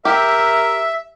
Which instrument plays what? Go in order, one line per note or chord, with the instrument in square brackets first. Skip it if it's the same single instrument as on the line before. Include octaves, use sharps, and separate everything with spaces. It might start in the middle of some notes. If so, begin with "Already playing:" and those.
[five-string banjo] G4 [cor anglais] A#4 [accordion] E5